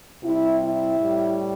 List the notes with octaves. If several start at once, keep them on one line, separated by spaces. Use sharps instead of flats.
C3 G3 E4
E4
A2 G3